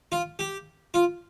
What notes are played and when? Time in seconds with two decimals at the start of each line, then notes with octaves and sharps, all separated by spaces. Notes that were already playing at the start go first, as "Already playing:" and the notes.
0.12 F4
0.39 G4
0.94 F4